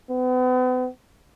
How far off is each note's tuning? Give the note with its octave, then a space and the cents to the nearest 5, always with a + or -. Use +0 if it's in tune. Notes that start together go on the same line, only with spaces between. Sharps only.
B3 +40